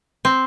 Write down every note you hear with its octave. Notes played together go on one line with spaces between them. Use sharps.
C4